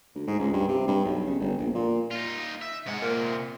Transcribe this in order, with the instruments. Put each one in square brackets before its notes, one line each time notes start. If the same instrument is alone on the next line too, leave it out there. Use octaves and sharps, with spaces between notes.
[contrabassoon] D2
G#2
C#2
G2
C3
G2
B1
C#3
G1
A#1
A#2
[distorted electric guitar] D#4 F4
E5
[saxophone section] G#2 G#3 [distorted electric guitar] C3 F#5
[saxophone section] A#2 A#3